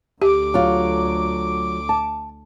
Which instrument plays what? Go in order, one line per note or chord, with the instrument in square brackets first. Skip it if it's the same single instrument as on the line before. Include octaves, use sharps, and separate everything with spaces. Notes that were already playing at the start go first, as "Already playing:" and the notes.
[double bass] D2 [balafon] G4 [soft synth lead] D6
[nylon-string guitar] F#3 F4
A5